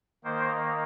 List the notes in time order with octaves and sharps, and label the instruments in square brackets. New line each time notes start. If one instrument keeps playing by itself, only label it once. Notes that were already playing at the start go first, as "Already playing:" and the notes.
[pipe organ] D#3 A#3 C5